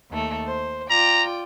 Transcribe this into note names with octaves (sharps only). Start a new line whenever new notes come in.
D#2 A3
C5
F4 D5 G5 A#5